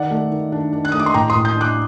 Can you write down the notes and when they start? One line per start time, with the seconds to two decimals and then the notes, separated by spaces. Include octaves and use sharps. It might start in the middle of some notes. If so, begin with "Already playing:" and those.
Already playing: D#3 D5 F#5
0.11 A3
0.31 D#3
0.52 D4
0.73 D4
0.85 F#6
0.92 A3 D#6
0.99 D6
1.06 C6
1.14 A2 G5 A#5
1.30 C6 D#6
1.35 A2
1.45 D#6 G6
1.55 D4
1.61 D6 F#6